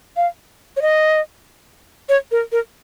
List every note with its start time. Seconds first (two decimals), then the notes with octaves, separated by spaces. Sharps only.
0.16 F5
0.76 C#5
0.82 D#5
2.09 C#5
2.31 A#4
2.52 A#4